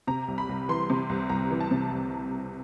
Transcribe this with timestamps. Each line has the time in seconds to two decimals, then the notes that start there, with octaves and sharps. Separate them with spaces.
0.07 C3 A#5
0.28 C2
0.38 B5
0.49 C2
0.69 E3 C6
0.90 C3
1.09 C2
1.29 C2 A#5
1.51 E3
1.60 A5
1.71 C3
1.91 C2